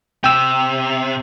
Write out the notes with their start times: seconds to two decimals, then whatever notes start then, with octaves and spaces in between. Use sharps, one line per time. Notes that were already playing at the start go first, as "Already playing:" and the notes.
0.24 C3 G5 E6